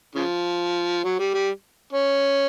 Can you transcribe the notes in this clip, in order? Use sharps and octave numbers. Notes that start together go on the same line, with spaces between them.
C#3 F3
F#3
G3
G3
C#4